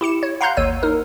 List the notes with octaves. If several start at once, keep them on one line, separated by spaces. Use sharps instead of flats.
E4 G4 C#7 E7
C#5
F5 F#5 A#5 C6 F#6 G6
G#1 D#2 C#5 E6 D#7
D#4 A#4